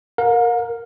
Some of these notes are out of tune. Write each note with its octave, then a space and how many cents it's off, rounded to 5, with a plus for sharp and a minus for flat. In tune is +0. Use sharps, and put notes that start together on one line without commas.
A#4 +0 F5 +45